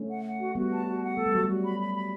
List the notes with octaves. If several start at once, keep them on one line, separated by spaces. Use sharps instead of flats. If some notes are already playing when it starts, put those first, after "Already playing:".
Already playing: A3 C#4
F#5
F#5
F#4
G3 B3 F#4
A5
F#4
F#5
A3 A4
G3
F#3 F#4
G3 F#4
B5
B5
B5